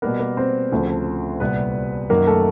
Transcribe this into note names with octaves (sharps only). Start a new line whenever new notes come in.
B2 G3 A#3 B3 A#4
A#3 A#4
C4 C5
D2 C#3 F3 A3
C2 A#2 G3 B3 B4
F#2 D#3 F#3 A#3 A#4
A3 A4